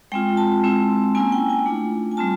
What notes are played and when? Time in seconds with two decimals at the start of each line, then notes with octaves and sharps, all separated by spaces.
0.12 G#3 C4 F4 G5
0.37 A5
0.64 G#3 C4 E4
1.15 A#3 C#4 E4 G#5
1.32 G5
1.50 G#5
1.66 A3 D4 F4
2.12 G#5
2.17 G3 C4 F4 A5